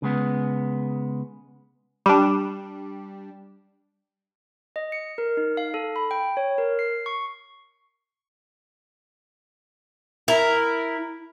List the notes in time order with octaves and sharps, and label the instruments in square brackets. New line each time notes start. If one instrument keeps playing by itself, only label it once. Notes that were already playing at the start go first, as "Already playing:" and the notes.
[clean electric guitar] C#3 G#3 B3
[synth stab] G3 D4
[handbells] D#5
C#7
A#4
D#4
F5
A4
B5
G5
C#5
A#4
C7
C#6
[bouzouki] E4 A#4